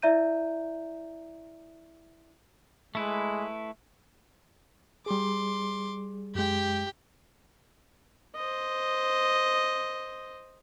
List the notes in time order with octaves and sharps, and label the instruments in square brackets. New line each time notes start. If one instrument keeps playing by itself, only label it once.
[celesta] E4 D5 E5 A#5 G6 D#7
[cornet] G#3 [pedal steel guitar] A3 E4 B4
[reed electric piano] G3 G#4 [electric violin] C6 D6
[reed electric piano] F#2 G#3 [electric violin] G4 G5
[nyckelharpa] C5 D#5